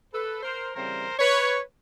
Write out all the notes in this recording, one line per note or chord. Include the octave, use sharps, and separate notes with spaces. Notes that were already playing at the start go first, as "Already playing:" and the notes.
A4 B4
A#4 C5
C#3 E3 G3 C4 A#4 C5
B4 C#5